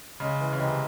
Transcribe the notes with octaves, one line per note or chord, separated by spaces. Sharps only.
C#3 G#3
E3
C#3
C3 G#3